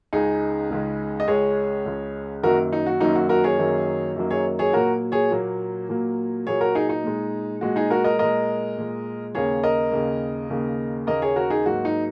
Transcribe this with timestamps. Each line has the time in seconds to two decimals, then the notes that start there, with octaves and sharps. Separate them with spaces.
0.13 C#2 C#3 G#3 D#4 G#4
0.70 C#2 C#3 G#3
1.20 D#5
1.28 C#2 C#3 G#3 G#4 C#5
1.86 C#2 C#3 G#3
2.43 F#2 D#3 F#3 A#3 F#4 A#4
2.72 D#4
2.86 F#4
3.00 F#2 D#3 F#3 A#3 D#4
3.15 F#4
3.29 F#4 A#4
3.44 G#4 C#5
3.58 F#2 D#3 F#3 A#3
4.16 F#2 D#3 F#3 A#3
4.30 G#4 C#5
4.59 G#4 C#5
4.73 A#2 F#3 A#3 F#4 A#4
5.12 G#4 C#5
5.31 A#2 F#3 A#3
5.89 A#2 F#3 A#3
6.46 A#2 F#3 A#3 G#4 C#5
6.61 F#4 A#4
6.75 D#4 G#4
6.89 D#4
7.04 A#2 G#3
7.61 A#2 G#3 F#4
7.76 D#4 G#4
7.90 F#4 A#4
8.04 A#4 D#5
8.19 A#2 G#3 A#4 D#5
8.77 A#2 G#3
9.35 D#2 C#3 A#3 G#4 C#5
9.64 A#4 D#5
9.92 D#2 C#3 A#3
10.50 D#2 C#3 A#3
11.07 D#2 C#3 A#3 A#4 D#5
11.22 G#4 C#5
11.36 F#4 A#4
11.50 D#4 G#4
11.66 G#2 F#3 A#3 F#4
11.85 D#4